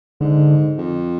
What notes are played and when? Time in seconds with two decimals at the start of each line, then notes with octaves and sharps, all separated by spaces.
0.21 G#2 D3
0.78 F2